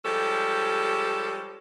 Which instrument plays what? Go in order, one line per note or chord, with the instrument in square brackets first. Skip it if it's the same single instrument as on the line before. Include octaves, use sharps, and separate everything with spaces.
[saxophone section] F3 G3 G#3 C#4 G4 A4